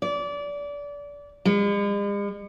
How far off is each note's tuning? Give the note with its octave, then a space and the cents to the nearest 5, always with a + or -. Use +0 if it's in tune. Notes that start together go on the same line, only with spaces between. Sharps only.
D5 -25
G#3 -45